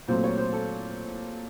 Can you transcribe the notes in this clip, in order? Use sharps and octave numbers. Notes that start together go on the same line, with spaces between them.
A#2 F#3 A3 C4 C5
C#5
C5
A4